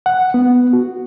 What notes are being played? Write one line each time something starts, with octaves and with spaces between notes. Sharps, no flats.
F#5
B3
F#4